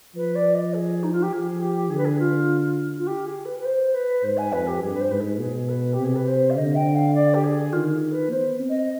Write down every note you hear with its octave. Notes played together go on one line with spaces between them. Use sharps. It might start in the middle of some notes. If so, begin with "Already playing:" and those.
F3 B4
D5
D#5
G#4
D#4
F4
G4
F3 G#4
G4
D3 G#4
B4
G#4
F4
F4
G4
G#4
B4
B4
C5
B4
G#2 C5
G#5
F2 B4
G4
G2 G#4
B4
C5
G#2 B4
G#4
B2 G#4
G#4
B4
G4
C3
G#4
B4
C5
F5
D3 D#5
G5
F5
D5
G4
G#4
D#3 F4
G#4
B4
B3 C5
C4
D#5